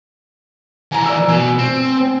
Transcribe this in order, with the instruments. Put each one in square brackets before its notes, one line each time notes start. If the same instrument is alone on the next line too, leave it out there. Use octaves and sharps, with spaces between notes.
[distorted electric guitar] E3 A#4 [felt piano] G#5 A#5
[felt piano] D5 E6
[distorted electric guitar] B2 [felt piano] G#5
[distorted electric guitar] C4